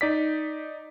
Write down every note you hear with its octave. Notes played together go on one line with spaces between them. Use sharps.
D#4 D5 B6